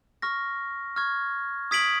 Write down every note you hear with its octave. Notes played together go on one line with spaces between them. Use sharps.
C#6 F6 A#6
C#6 F6 G#6
D#6 G#6 B6 D7 F#7